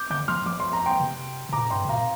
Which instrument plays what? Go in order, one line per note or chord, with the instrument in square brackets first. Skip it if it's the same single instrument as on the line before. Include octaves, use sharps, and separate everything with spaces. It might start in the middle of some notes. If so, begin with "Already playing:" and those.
Already playing: [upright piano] D6 G6
[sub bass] D3 [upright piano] D6 G6
[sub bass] F3 [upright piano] C6 F6
[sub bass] F3 [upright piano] D6
[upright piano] C6
A#5
G5 C6
[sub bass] C3
C3
[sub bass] A#2 [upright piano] A#5 D6
[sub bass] G2 [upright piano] G5 C6
[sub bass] C3
[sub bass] A#2 [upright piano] F5 A#5